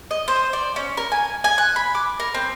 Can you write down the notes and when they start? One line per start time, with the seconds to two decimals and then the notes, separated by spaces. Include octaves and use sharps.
0.11 D#5
0.28 C5
0.53 D5
0.76 C#4
0.97 A#4
1.12 G#5
1.44 G#5
1.58 F#6
1.76 B5
1.95 D6
2.20 A#4
2.34 C4